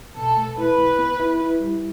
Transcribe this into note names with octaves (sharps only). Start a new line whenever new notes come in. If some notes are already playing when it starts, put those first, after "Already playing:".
B2 A4
A3
E4 B4
C2
B3
E4
E4
G3